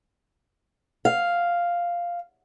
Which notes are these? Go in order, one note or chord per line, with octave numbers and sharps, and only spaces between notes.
F5